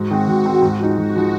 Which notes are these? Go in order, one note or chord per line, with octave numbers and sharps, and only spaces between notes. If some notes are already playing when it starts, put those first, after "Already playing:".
Already playing: G#2 F#4
D#3 G#3 C4
G#2 F#4
D#3 G#3 C4
G#2
F3 G#3 D#4
G#2 F#4
F3 G#3 D#4